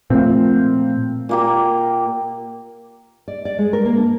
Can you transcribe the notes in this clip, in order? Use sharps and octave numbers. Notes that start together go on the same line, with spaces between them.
A#2 F3 A3 A#3 C4
A#2 A#3 G4
D5
D5
G#3
A#4
A#3
D4